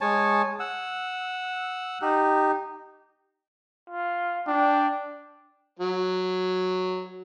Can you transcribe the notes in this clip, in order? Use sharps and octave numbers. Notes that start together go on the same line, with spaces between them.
G#3 C#5 G#5 A5
F#5 E6
D#4 G4
F4
D4 G5
F#3